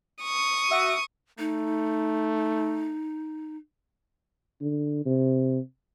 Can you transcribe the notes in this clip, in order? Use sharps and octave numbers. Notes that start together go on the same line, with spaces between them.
C#6 D#6
F#4 E5
A3 D#4
D3
C3